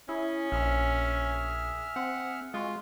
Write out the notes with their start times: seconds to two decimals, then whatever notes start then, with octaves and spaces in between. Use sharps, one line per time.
0.09 C#4 E4 G#4
0.52 A#1 G#4 E5 F6
1.96 C4 F#5
2.54 G#3 F4 F#4